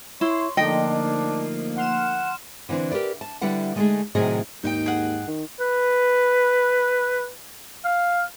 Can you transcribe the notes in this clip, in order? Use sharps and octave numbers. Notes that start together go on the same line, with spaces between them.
E4 C#5 C6
D3 F3 A3 A#3 D4 D#4 D#5 G5
F#5 C6 F6 E7
D3 E3 C4 D4
G4 A#4 B4 D5
A5
D3 G3 E4 B4 F#5
D3 G#3 A3 D4 D#4 G#4
A2 C3 D#3 F#3 G#4 D#5
D#2 G#2 D#4 G5
G#4 F#5
D#3
B4
F5